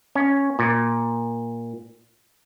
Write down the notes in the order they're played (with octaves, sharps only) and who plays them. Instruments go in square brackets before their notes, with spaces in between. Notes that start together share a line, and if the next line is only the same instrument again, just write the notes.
[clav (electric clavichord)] C#4
A#2